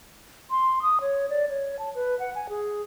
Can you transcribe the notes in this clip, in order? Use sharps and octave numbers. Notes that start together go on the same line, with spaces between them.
C6
D#6
C#5
D5
C#5
A5
B4
F#5
G#5
G#4